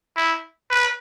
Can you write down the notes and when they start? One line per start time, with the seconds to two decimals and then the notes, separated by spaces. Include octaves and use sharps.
0.17 E4
0.70 B4